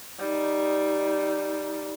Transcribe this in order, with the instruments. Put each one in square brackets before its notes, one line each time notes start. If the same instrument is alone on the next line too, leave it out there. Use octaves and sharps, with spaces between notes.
[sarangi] G3 [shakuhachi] D#4